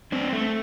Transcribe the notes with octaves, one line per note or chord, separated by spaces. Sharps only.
C4 D4
A3